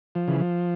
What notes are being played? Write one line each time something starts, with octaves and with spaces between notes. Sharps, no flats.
F3
C#3 E3
F3